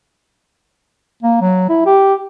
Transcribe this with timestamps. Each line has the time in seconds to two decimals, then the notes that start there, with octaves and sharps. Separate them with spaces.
1.23 A#3
1.41 F#3
1.69 E4
1.86 G4